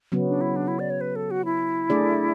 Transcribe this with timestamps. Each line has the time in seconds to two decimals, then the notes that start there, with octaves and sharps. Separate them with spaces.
0.12 C#3 F#3 B3
0.27 D4
0.41 E4
0.56 D4
0.68 E4
0.79 D5
0.90 C#5
1.01 B4
1.16 A4
1.31 F#4
1.45 E4
1.90 A3 D4 G#4 D5